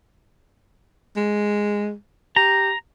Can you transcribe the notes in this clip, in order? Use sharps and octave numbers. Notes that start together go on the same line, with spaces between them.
G#3
G4 A#5